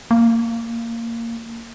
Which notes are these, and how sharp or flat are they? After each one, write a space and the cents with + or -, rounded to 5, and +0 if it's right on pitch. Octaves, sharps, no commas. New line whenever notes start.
A#3 -15